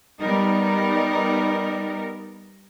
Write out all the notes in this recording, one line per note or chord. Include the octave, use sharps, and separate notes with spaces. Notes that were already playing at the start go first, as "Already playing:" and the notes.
G3 B3 D#4 A#4